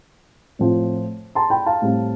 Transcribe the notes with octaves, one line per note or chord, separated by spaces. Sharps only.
A2 F3 C4
A5 C6
G5 B5
F5 A5
A2 G3 C4